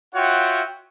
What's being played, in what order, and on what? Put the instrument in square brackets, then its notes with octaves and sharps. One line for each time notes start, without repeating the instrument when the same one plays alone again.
[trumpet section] F4 F#4 C#5 E5 F#5 G5